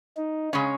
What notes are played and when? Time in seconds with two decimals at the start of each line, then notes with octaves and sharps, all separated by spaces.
0.17 D#4
0.53 C#3 G#3 C#4